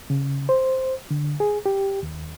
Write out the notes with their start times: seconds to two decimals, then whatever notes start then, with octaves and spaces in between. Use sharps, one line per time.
0.10 C#3
0.49 C5
1.11 D3
1.40 G#4
1.66 G4
2.03 D#2